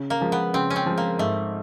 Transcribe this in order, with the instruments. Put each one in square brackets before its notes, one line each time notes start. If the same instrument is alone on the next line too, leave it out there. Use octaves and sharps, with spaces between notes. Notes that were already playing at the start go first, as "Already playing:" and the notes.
Already playing: [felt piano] C#3
[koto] A#3
[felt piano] F3 G#3
[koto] B3
[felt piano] C#3 [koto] C4
[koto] C#4
C4
[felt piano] F3 G#3
[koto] A#3
[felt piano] G#2 [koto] A3